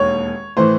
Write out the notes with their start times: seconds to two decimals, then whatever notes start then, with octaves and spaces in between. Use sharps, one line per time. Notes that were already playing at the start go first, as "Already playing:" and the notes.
Already playing: E1 D#2 C#5
0.57 A2 E3 C5